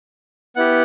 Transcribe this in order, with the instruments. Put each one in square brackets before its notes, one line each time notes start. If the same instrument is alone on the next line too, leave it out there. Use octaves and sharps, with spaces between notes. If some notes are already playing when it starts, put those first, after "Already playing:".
[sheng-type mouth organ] B3 E4 G4 F#5